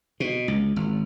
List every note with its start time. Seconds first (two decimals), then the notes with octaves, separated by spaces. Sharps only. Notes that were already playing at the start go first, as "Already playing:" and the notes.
0.20 B2
0.48 C#2
0.76 G#1